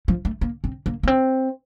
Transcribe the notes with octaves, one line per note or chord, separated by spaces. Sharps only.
F3
A3
A#3
C4
A#3
A#3
C4